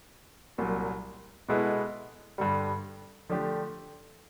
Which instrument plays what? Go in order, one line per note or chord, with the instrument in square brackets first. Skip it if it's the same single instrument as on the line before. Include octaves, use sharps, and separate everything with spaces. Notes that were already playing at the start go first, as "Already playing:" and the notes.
[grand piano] C2 A#2 F#3
B2 G#3 B3 E4 A4
G2 D3 G3
D3 F3 A3 D4 G4